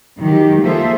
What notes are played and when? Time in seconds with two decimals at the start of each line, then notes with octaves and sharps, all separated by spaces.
0.19 D#3 F#3 G4
0.64 A#3 F4 G#4 A4 C5 E5